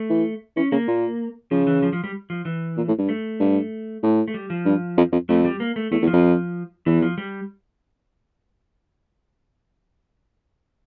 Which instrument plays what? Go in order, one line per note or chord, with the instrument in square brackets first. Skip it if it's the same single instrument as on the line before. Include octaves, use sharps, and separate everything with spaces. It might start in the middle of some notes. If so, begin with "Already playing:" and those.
Already playing: [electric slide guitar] A3
[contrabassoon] E3
[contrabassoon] E3 [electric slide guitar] C#4
[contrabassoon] C#3 [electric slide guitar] A#3
[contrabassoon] A#2
[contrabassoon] C#3 [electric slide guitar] F3
[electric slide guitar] E3
F3
F3
G3
F3
E3
[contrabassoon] A#2
A2
G2
[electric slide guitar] A3
[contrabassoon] G2
A2
[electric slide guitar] A3
G3
F3
[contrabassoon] G2
F2
F2
[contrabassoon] F2 [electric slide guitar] A3
[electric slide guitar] G3
A#3
A3
[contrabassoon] E2 [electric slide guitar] A3
[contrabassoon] E2
[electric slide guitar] F3
[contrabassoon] F2
[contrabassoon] E2 [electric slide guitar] E3
[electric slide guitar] F3
G3